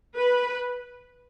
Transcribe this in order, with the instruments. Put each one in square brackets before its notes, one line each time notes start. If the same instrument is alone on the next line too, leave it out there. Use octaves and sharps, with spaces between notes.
[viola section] B4